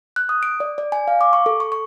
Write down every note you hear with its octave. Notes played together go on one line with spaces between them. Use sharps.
F#6
D#6
D7
D5
D5
G#5
F5
D6
C#6
A4
C#6
C#6